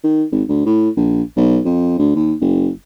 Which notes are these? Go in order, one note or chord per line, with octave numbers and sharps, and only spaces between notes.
D#3
G#1
D2
A2
A#1
B1
F2
D2
D#2
F#1